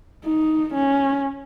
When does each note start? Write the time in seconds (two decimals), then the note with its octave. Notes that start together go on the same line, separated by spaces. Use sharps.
0.25 D#4
0.74 C#4